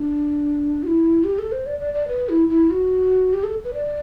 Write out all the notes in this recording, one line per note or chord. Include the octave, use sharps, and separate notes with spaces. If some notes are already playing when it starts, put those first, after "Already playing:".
Already playing: D4
F#4
E4
G4
A4
C5
D5
D5
D5
B4
E4
E4
F#4
G4
A4
B4
D5